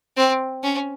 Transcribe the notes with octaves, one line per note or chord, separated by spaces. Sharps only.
C4
C#4